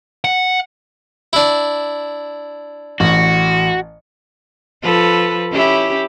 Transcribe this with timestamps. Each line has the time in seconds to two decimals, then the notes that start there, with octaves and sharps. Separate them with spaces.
0.24 F#5
1.33 D4 E4
3.00 A1 F#4
4.82 F3 A4 B4
5.51 C#4 E4 G4